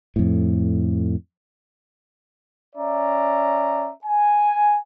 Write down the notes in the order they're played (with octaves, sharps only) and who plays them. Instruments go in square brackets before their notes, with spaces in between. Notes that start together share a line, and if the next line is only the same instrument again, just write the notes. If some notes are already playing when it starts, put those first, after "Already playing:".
[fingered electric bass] F2 A2
[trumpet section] C#4 D5 E5 A#5
G#5